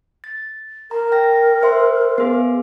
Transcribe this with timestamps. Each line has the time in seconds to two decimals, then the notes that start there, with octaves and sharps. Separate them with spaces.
0.24 A6
0.91 A#4 A#5
1.12 G5 A#6
1.62 C5 E5 C6
2.18 B3 G#4